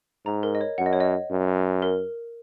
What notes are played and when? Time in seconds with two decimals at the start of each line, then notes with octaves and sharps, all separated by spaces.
0.25 G#2 A#5
0.43 A#4
0.55 D#5
0.61 C#5
0.78 F#2 F#5
0.86 D#5
0.93 C#5
1.01 D#5
1.30 F#2
1.82 A#4